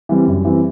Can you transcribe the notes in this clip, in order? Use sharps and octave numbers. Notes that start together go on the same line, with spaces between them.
E3 G3 C4
F#2
E3 G3 C4